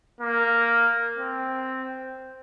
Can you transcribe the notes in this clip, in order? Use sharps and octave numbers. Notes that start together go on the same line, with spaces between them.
A#3
C4